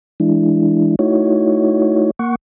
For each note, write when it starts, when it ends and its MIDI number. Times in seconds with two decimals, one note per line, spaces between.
0.20 0.96 52
0.20 0.96 56
0.20 0.96 62
0.20 0.96 64
0.99 2.11 57
0.99 2.11 63
0.99 2.11 64
0.99 2.11 66
0.99 2.11 73
2.19 2.35 58
2.19 2.35 78
2.19 2.35 85